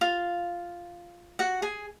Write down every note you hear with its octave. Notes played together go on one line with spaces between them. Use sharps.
F4 F5
F#4 F#5
G#4 G#5